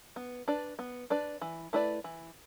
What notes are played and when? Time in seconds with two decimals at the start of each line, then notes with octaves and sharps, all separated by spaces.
0.16 B3
0.48 D4 B4 D5
0.79 B3
1.10 D4 B4 D5
1.42 E3
1.73 A3 E4 B4 D5
2.04 E3